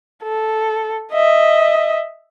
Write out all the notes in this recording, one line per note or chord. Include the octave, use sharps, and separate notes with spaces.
A4
D#5 E5